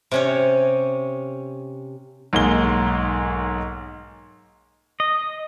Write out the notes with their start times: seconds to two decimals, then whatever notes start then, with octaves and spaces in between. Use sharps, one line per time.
0.11 C3 C#4 C#5
2.33 B1 G#2 A#3 G#4 A#5 G7
5.00 D#5